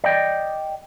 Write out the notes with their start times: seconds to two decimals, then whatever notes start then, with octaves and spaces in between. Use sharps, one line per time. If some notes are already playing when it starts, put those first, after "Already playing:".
0.04 D5 D#5 G5